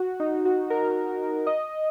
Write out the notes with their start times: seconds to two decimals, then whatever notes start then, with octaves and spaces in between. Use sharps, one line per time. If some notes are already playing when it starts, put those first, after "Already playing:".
Already playing: F#4
0.20 D#4
0.45 F#4
0.70 A#4
1.47 D#5